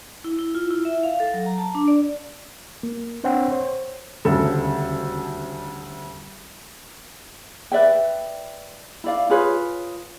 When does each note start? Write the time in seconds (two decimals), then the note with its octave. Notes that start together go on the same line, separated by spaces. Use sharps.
0.24 E4
0.39 E4
0.55 F4
0.70 E4
0.85 E5
1.03 F5
1.20 A4
1.34 F#3
1.46 A#5
1.58 A5
1.75 D4
1.88 D5
2.83 A#3
3.24 C4 D4 C5 C#5 F#5 G5
3.51 C5 C#5
4.25 D#1 D2 C#3 A4
7.72 B4 D5 E5 G5
9.04 E4 D5 F5
9.30 F4 G#4 B4 C#5